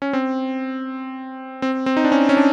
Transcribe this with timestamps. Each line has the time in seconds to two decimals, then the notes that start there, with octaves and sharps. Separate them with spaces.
0.02 C#4
0.13 C4
1.62 C4
1.86 C4
1.97 D#4
2.04 D4
2.12 C#4
2.29 C#4
2.37 D4